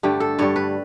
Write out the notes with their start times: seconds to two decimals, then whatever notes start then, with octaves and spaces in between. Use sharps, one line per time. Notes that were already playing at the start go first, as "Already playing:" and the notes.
0.03 G2 D3 A3 G4
0.20 A4
0.39 G2 D3 G3 C#5
0.56 B4